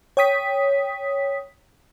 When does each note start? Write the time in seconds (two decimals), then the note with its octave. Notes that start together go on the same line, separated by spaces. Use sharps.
0.17 C#5 G5 D#6 B6